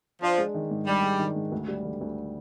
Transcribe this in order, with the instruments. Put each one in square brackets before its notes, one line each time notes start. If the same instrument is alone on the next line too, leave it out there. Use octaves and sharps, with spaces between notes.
[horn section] F3 [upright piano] D4
[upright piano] G#3
D#3
G#2
[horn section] G3 [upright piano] D4
[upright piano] G#3
D#3
G#2
D2
G3
D3
D2